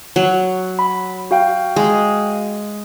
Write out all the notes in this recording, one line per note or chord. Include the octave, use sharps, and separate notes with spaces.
F#3
B5
F#4 F5 G5
G#3